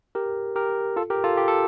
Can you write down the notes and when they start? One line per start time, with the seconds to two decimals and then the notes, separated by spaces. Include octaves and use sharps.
0.15 G4 A#4
0.55 G4 A#4
0.96 F4 A4
1.10 G4 A#4
1.24 F4 A4
1.37 G4
1.48 A4